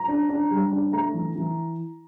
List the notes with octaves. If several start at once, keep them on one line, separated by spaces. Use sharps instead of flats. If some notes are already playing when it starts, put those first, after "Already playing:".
Already playing: A#5
D4
D4
G3
D4
A3 A#5
E3
E3